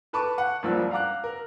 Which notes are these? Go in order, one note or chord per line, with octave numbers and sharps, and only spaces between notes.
A4 B4 A5 B5 C#6 D6
F#5
F#1 C#2 F3 G3 D4 E6
F5 F#5 A#5 D6 F#6
A#4